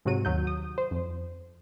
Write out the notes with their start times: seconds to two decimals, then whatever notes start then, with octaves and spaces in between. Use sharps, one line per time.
0.05 G#2 C3 F#3 F#4 D#7
0.25 D#2 F#3 G6
0.47 D#6
0.78 C5
0.91 F2